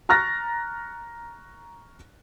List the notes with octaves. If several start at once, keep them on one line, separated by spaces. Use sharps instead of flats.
A#5 C#6 F6 F#6 A6 A#6